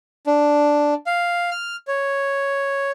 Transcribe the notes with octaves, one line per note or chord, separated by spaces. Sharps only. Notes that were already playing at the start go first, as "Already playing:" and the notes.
D4
F5
F6
C#5